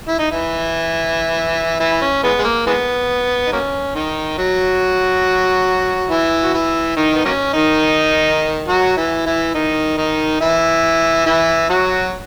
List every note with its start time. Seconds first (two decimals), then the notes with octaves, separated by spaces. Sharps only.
0.08 E4
0.19 D#4
0.31 E3 E4
1.80 E3 E4
2.02 C#4
2.24 E3 G#3 B3
2.39 G#3
2.44 A#3
2.66 E3 G#3 B3
3.47 D#4
3.52 F#3 A#3 C#4
3.95 D#3 D#4
4.38 F#3 F#4
6.10 E3 E4
6.43 F#4
6.54 E3 E4
6.96 D#3 D#4
7.14 B3
7.25 F#3 A#3 C#4
7.53 D#3 D#4
8.68 F#3 F#4
8.97 E3 E4
9.26 E3 E4
9.54 D#3 D#4
9.98 D#3 D#4
10.41 E3 E4
11.26 E3 E4
11.70 F#3 F#4